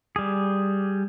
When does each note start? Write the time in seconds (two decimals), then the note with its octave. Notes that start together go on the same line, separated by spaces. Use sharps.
0.16 G3 G#4